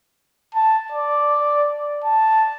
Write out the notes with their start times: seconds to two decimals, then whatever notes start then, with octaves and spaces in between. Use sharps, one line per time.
0.55 A5
0.92 D5
2.04 A5